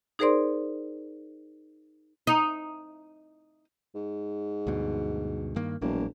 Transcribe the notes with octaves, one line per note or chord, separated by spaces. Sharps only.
D#4 G#4 A#4 C5 D5 C6
D#4
G#2
D2 G2 B2
G2 D#3 A#3
E1 A#1 F#3 A#3